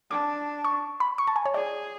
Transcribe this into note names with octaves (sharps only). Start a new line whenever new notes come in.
D4 D6
C#6
B5
C#6
A5
G#5
C#5
G#4 D5